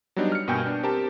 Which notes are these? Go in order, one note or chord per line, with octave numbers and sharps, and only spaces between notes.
F#3 G3 B3 D4 D#4
F6 C#7
G2 B2 A#3 G5 G#5 G6
B3 D4
C4 G4 A#4 A5